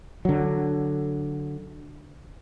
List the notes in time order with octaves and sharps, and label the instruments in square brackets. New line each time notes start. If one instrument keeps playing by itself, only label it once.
[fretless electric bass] D3 F#3